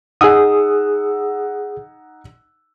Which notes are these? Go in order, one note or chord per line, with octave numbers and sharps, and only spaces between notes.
D#4 G#4 F#5 D#6 E6